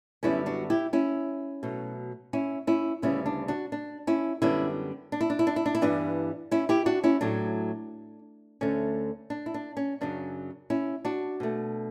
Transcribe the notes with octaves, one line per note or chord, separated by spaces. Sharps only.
F#2 D3 G3 B3 C#4 E4
D4 F#4
E4 G4
C#4 E4
B2 F#3 A3
C#4 E4
C#4 E4
D2 C#3 G3 B3 C#4 E4
D4
D4 F#4
D4
C#4 E4
F#2 D3 G3 B3 C#4 E4
D4
E4
D4
E4
D4
E4
D4
E4
G2 E3 G3 B3 D4
C#4 E4
E4 G4
D4 F#4
C#4 E4
A2 F#3 A3 D4
D2 D3 A3 C#4
D4
E4
D4
C#4
F#2 C#3 F#3 D4
C#4 E4
D4 F#4
B2 A3